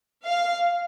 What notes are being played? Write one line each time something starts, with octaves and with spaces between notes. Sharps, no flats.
F5